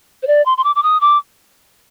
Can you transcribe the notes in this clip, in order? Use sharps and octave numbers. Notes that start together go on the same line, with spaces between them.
C5
D5
C6
C6
D6
D6
D#6
D6